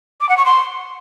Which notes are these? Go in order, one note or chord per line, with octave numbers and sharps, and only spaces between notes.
D6
F#5
C#6
C6